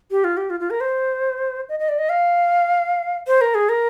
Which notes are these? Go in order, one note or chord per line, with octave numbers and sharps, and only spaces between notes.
G4
F4
G4
F4
F4
A#4
C5
D#5
D#5
D5
D#5
F5
C5
A#4
G#4
A#4